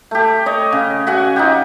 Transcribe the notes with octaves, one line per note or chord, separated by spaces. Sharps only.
A3 G4
C#5 D#5
C#3
F#4 E5 F#5 G#5
D#4 F4 G4